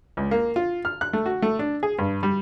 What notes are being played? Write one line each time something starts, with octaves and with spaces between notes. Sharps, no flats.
C#2
A#3
F4
F6
F#6
A3
F#4
A3
D4
G#4
G2
G3